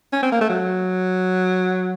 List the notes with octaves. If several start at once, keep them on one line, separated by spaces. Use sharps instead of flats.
C#4
C4
A#3
A3
F#3